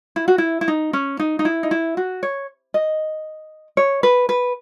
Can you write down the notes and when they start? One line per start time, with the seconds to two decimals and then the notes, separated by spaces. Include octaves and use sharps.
0.16 E4
0.28 F#4
0.38 E4
0.61 E4
0.68 D#4
0.93 C#4
1.19 D#4
1.39 D#4
1.45 E4
1.63 D#4
1.71 E4
1.97 F#4
2.23 C#5
2.74 D#5
3.77 C#5
4.03 B4
4.29 B4